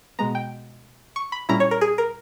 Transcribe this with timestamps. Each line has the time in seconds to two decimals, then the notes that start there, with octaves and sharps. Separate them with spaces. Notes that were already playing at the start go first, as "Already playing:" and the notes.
0.19 B2 G#3 B3 A#5
0.35 G5
1.16 C#6
1.32 B5
1.49 A#2 G3 C#4 E4 A#5
1.60 C#5
1.71 A#4
1.81 G#4
1.98 A#4